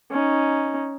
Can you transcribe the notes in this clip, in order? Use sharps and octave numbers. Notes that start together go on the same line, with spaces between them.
C#4 D#4